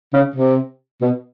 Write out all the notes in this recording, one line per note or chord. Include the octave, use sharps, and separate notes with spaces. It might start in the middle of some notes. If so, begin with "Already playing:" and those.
C#3
C3
B2